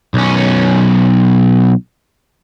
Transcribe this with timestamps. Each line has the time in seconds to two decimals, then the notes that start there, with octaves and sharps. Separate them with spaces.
0.14 B1 C#4